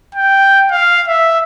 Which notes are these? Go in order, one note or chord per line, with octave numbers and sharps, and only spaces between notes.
G5
F5
E5